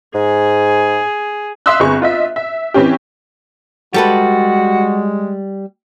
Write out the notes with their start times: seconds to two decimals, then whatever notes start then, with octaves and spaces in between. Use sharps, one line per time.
0.15 G#2 G#4
1.66 E5 F5 C6 D#6 E6 F#6
1.80 G1 C4 G#4 C#6
2.02 F4 D#5 E5
2.36 E5
2.74 E3 C4 C#4 G4
3.94 G3 G#3 F#4 A4 B4